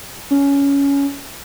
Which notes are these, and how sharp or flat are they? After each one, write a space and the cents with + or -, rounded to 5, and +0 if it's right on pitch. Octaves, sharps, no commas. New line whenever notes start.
C#4 +15